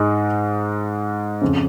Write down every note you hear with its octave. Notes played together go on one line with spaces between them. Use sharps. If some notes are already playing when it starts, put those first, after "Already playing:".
Already playing: G#2 G#3 D#4
F2 C#3